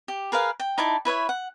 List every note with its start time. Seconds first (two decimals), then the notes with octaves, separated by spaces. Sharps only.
0.08 G4
0.32 G#4 A#4 B4 F5
0.60 G5
0.78 D#4 E4 D5 A5
1.05 E4 B4 C#5 E5
1.29 F#5